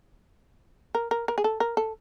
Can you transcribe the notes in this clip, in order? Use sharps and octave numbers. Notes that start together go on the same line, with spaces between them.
A#4
A#4
A#4
G#4
A4
A#4
A4